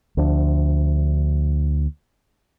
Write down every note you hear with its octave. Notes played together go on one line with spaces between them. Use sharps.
D2 F3 D4